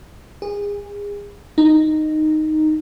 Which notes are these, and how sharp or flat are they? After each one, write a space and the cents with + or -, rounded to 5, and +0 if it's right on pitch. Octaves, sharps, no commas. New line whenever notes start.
G#4 -30
D#4 -5